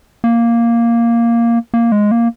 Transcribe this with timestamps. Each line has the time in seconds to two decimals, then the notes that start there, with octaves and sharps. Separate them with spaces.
0.24 A#3
1.74 A#3
1.92 G#3
2.11 A#3